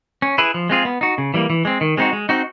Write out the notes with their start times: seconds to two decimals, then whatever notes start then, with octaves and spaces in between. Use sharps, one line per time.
0.22 C#4
0.38 E4 G#4 B4
0.54 F3
0.69 G#3 C4 F4 G#4
0.85 B3
1.01 D#4 F#4
1.18 C#3
1.34 E3 G3 A#3
1.50 E3
1.65 G#3 C4
1.81 D#3
1.97 G#3 C4 D#4 F#4
2.13 G#3
2.29 C4 D#4 F#4